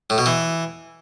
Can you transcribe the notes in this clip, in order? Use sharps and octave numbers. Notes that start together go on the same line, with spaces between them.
A2
B2
E3